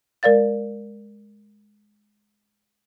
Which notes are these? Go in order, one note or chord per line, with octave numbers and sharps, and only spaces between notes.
G#3 A#4 D5 F5 A6